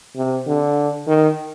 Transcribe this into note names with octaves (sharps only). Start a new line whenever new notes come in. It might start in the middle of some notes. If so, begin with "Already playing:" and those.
C3
D3
D#3